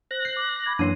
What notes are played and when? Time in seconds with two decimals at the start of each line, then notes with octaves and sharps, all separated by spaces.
0.11 C5 F#6 A#6
0.25 G6 C7
0.37 D6
0.66 B5 D6 G#6
0.79 F#2 E3 A#3 D4 C#5 C6 C7 D#7